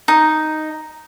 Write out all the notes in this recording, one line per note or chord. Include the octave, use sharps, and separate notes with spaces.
D#4